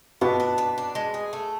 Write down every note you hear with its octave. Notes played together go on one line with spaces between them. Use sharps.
B2 B3 D4
D4
B4
D4
G#3
G#4
A3